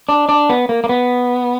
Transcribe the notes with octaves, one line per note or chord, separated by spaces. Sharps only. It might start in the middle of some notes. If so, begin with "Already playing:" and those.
D4
D4
B3
A#3
A#3
B3